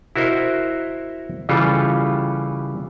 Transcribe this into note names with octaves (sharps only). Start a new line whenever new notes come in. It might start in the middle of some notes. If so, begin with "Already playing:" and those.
E4 F#4 A#4 C5 D#5 E5
C#3 E3 G3 F4 G4 A4